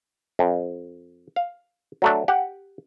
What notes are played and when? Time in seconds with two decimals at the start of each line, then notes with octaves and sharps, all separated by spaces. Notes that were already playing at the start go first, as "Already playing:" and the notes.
0.39 F2
1.36 F5
2.02 F#3 A3 D4
2.28 G4 F#5